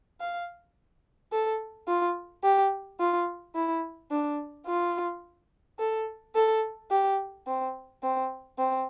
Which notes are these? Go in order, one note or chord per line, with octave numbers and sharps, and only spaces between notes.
F5
A4
F4
G4
F4
E4
D4
F4
A4
A4
G4
C4
C4
C4